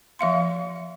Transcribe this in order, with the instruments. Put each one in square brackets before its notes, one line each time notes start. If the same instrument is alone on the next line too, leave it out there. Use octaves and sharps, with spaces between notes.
[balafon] F3 E5 F5 C6